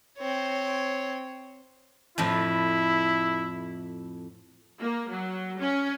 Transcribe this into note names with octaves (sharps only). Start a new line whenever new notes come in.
C4 C#5
F2 A2 F3 E4
A#3
F#3
C#4